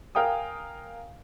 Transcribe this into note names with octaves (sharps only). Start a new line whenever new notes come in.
A#4 F5 G5 G#5 D#6